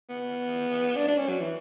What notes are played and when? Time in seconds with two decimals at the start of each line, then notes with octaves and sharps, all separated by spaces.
0.09 B3
0.96 D4
1.07 D4
1.18 C#4
1.29 F#3
1.40 E3